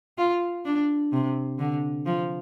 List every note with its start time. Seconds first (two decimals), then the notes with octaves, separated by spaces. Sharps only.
0.18 F4
0.65 D4
1.12 C3
1.59 D3
2.06 F3